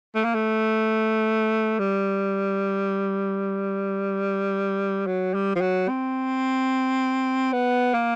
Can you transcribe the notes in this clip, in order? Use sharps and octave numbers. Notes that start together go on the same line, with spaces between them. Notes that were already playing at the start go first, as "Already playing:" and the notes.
A3
A#3
A3
G3
F#3
G3
F3
F#3
C4
B3
A#3